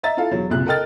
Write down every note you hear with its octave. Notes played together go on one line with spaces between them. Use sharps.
D#5 E5 A#5 A6
E4 F4 A4 F5
E1 F#3
F#1 C2 A#2 F#6
A4 A#4 D#5 G5 F6 A6